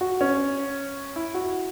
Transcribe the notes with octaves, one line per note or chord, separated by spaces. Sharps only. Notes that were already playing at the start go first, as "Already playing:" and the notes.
F#4
C#4
E4
F#4